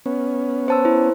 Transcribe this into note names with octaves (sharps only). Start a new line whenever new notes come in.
B3 C#4
C5 A5 E6
E4 C5